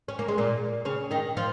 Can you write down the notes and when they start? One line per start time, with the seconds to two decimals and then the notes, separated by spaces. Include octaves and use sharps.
0.08 C#4
0.19 A#3
0.28 G#3
0.38 A#2 A#3
0.85 C#3 C#4
1.11 D#3 D#4
1.37 F3 F4